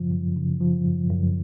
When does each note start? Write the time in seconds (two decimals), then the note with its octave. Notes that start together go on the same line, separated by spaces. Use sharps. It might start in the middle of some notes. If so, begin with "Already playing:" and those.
Already playing: F#2 C#3 F3
0.11 F#2
0.36 C#3
0.61 F3
0.85 F#2
1.10 F#2